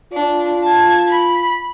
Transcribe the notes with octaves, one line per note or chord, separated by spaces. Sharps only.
D4 F4
A5 G#6
B5